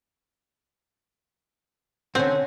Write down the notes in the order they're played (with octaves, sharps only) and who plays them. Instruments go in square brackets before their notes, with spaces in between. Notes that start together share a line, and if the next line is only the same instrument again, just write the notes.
[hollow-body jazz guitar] D3 C#4 [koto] C4